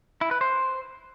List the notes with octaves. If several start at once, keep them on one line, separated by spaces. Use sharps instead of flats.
E4
B4
C5